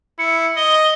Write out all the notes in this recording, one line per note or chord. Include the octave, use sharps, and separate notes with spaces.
E4 C#7
D#5 G7